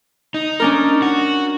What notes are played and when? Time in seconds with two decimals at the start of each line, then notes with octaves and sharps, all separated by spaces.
0.34 D#4
0.60 C#4 D4 A#4
1.02 F#4